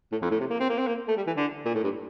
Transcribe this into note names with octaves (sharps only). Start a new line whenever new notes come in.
A2
F2
A2
C3
A#3
C4
A#3
C4
A#3
A3
G3
E3
D3
A#2
A2
G2